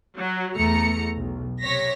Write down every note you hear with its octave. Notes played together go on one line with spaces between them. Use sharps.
F#3
E2 A3 A#5 C#7
B1
C3 C#5 A#6 B6